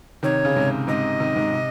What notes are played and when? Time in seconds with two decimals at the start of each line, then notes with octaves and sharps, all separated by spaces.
0.23 C3 D#3 C#5
0.45 C#3
0.56 G#2 C3
0.87 G#2 C3 D#5
1.20 C3 D#3
1.36 G#2 C3
1.53 C3